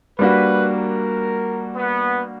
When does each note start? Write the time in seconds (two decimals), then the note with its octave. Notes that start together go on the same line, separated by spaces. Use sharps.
0.19 G3 A#3 D4 F#4 B4
0.72 A#4
1.76 B3